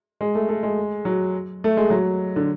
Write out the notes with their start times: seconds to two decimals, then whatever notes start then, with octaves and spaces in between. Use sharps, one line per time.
0.21 G#3
0.35 A3
0.49 A3
0.63 G#3
1.05 F#3
1.64 A3
1.77 G#3
1.90 F#3
2.36 D3